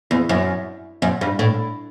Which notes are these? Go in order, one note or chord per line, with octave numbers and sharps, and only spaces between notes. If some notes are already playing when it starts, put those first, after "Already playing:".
E2
F#2
F#2
G2
A2